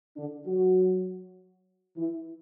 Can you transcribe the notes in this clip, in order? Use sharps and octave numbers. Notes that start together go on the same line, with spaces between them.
D3 D4
F#3 F#4
E3 E4